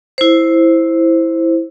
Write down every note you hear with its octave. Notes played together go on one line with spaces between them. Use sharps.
E4 C5